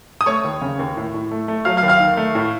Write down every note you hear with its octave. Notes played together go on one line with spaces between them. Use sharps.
D#6
A3 C#5 C#6
D#2
C#3
D#2
A2
A2
A3
A3
F#3 F5 F6
F5 F6
D#2
F5 F6
D#3
A3
A2